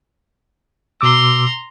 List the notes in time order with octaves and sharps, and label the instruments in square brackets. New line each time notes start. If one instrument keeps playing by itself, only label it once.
[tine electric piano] B2 D6 E6 [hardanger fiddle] A#5 C6